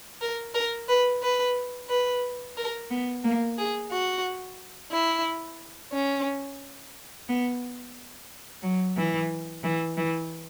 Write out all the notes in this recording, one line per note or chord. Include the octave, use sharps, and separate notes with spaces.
A#4
A#4
B4
B4
B4
A#4
B3
A#3
G#4
F#4
E4
C#4
B3
F#3
E3
E3
E3